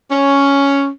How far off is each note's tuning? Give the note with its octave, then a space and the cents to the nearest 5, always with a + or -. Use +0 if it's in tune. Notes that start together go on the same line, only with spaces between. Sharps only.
C#4 +5